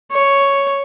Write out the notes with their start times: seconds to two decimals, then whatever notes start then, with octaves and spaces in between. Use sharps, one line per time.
0.11 C#5